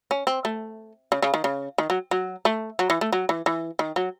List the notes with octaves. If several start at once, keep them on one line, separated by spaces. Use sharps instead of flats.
C#4
C4
A3
C#3
C#3
D#3
C#3
D#3
F#3
F#3
A3
F#3
E3
A3
F#3
E3
E3
D#3
F#3